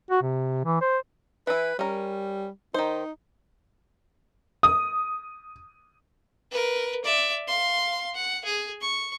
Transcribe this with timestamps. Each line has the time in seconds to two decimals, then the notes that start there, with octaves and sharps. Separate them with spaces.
0.11 F#4
0.22 C3
0.65 E3
0.81 C5
1.47 E3 E4 B4
1.79 G3 C#4 A#4
2.74 D#3 D#4 C5
4.63 D#6
6.51 A#4 B4
7.04 D5 E5
7.47 F5 C6
8.14 F#5
8.45 G#4
8.81 C#6